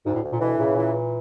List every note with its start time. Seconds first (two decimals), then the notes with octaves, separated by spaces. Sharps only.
0.05 D2 G#2
0.14 A2
0.23 D2
0.32 A#2
0.41 B2 E3
0.58 A#2 C#3
0.66 A2
0.73 A#2 E3
0.94 E3